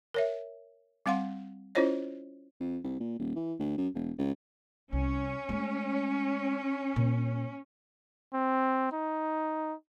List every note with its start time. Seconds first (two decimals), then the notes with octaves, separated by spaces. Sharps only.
0.14 A#4 C#5 E5
1.06 G3 C4 F5 F#5 C6
1.75 C#4 E4 F4 C5 C#5 D#5
2.60 F2
2.84 C2
3.00 A#2
3.19 D#1
3.35 E3
3.59 D2
3.78 F#2
3.94 E1
4.18 C#2
4.93 C2 C#4
5.49 G#3 A3
6.96 A#2
8.34 C4
8.92 D#4